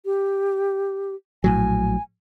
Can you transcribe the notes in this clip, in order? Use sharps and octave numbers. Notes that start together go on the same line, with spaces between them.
G4
A#1 A2 F#3 G#5